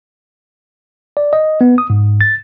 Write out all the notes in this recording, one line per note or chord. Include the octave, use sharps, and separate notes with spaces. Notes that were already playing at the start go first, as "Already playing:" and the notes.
D5
D#5
B3
D#6
G#2
A6